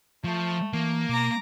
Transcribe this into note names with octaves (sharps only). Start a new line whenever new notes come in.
F3 A3
E3 A#3
B2 A#5 D6